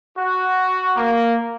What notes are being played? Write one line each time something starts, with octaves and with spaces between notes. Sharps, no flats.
F#4
A#3